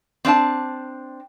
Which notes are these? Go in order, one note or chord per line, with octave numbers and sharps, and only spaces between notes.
C4 D4 E5 A5